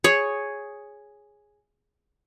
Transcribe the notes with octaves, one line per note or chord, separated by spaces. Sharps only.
G#4 C#5